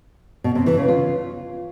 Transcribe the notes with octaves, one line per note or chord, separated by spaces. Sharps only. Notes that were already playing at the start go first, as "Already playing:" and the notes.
B2
C3
E3
C#3
F4